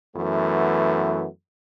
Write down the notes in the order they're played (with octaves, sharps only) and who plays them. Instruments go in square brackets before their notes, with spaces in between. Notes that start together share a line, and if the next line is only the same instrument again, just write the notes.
[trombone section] F#2 E3 A3 B3